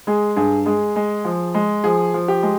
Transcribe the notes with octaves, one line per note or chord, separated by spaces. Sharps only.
G#3 G#4
G2 G#4
G#3 G#4
G#3
F3
G#3
F3 G#4
F3
G4
G#3